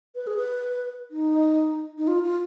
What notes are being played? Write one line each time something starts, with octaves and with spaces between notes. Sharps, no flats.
B4
G#4
B4
D#4
D#4
F4
F4